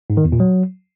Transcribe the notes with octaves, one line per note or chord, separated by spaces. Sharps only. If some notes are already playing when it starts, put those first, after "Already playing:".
G#2
D#3
E2
A#2
F#3